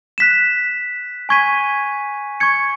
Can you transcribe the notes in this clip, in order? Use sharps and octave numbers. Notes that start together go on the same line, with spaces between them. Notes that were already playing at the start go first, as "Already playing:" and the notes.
F#6 B6 E7
G#5 C#6 G#6 B6 D#7
C#6 G#6 C#7